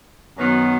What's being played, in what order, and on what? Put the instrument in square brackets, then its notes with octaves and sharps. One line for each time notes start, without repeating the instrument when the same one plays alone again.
[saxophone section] F#2 D#3 F#3 B3